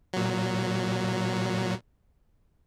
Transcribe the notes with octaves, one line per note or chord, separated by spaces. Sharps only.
A#2 F#3